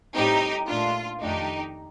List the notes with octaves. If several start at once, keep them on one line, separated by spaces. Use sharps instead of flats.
A2 G3 C4 D#4 G4
A#2 A3 D4 F4
F2 D#3 A3 D4 D#4 G4